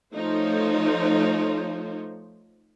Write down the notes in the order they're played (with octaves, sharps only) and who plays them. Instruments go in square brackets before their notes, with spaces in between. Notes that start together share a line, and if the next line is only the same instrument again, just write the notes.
[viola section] F3 A3 D#4 C5 C#5